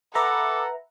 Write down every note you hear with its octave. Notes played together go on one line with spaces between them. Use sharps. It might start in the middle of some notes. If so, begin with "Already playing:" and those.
A4 B4 E5 F#5 A#5 D6